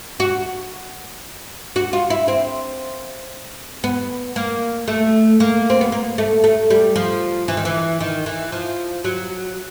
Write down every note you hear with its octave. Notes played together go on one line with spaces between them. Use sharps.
F#4
F#4
F4
E4
C4
B3
A#3
A3
A#3
C4
B3
A#3
A3
A3
G3
F3
E3
D#3
E3
D#3
E3
F3
F#3